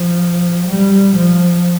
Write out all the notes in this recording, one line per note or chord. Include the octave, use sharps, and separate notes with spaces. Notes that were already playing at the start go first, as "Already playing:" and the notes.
Already playing: F3
G3
F3